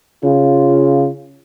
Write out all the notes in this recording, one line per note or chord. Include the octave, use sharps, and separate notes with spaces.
C#3 F4